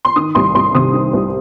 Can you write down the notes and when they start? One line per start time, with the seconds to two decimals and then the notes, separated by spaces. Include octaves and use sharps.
0.05 C6
0.16 D#3 D#6
0.35 C2 C6
0.55 C2 C6
0.75 C3 D#6
0.93 D#3
1.13 C2